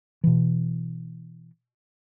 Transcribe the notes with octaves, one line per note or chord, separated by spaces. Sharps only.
B2 E3